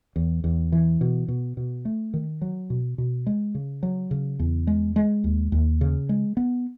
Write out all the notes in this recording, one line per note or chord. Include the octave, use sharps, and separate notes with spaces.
E2
E2
E3
B2
B2
B2
A3
D#3
F#3
B2
B2
G#3
C#3
F#3
C#3
E2
G#3
G#3
D#2
D#2
C#3
G#3
B3